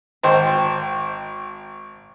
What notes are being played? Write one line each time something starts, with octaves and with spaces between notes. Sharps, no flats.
G#1 C5 D#5 G5